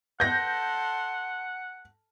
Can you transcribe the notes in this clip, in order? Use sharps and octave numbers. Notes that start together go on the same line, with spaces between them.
A4 F#5 C6 G6 A#6